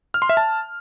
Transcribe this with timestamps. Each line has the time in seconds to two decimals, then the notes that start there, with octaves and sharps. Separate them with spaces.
0.14 F6
0.22 C6
0.29 E5
0.37 A5